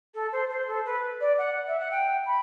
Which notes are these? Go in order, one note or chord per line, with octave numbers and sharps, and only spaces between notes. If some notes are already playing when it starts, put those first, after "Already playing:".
A4
C5
C5
A4
B4
D5
F#5
E5
F#5
G5
B5